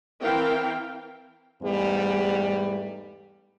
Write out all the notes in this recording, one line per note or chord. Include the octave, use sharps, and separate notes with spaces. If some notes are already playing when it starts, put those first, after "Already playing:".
E3 C4 E4 A#4 F5 G5
E2 G#2 G3 A3 B3